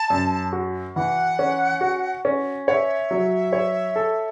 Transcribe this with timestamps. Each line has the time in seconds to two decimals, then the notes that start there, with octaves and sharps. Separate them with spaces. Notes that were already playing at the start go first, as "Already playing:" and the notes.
Already playing: A5
0.10 F#2
0.53 F#4
0.96 E3 F#5
1.39 C#4
1.81 F#4
2.25 C#4
2.67 C#5 E5 F#5
3.11 F#3
3.53 C#5
3.96 A4